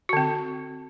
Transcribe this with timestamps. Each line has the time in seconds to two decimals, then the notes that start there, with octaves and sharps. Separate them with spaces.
0.09 F#4
0.13 D3
0.17 C4